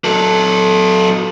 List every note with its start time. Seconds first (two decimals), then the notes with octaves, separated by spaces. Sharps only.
0.04 F#3 A4